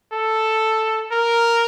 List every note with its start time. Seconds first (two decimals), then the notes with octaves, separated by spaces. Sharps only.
0.13 A4
1.12 A#4